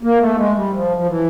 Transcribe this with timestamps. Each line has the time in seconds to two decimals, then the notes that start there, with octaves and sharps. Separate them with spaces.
0.03 A#3
0.21 A3
0.37 G#3
0.55 G3
0.72 F3
0.97 F3
1.06 E3